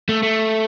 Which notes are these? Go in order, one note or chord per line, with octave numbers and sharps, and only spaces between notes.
A3
A3